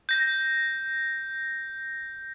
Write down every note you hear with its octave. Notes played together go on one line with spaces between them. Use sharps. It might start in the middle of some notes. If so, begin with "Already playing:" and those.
G6 A#6